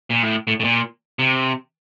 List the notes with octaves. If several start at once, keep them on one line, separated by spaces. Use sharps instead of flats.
A#2
A2
A2
A2
A#2
C3